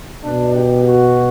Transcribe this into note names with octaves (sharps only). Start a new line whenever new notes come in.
B2 D4
G4
F#4